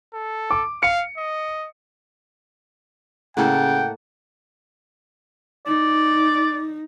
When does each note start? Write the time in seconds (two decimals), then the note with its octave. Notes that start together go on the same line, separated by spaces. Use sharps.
0.14 A4
0.51 D6
0.83 F5 C#7
1.18 D#5
3.37 A2 C#3 A#3 A4 F#5 G5
5.66 D#4 D5